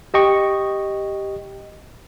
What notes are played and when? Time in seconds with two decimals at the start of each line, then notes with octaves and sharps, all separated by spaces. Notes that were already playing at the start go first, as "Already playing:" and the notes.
0.14 G4 D#5 G5 C#6